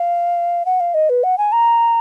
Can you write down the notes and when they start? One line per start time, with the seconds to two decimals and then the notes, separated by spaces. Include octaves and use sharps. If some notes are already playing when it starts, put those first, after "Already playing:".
Already playing: F5
0.66 F#5
0.80 F5
0.94 D#5
1.09 B4
1.23 F#5
1.38 G#5
1.52 A#5